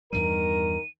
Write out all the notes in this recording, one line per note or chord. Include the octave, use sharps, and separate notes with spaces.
E2 G2 D#3 G3 A#4 D#7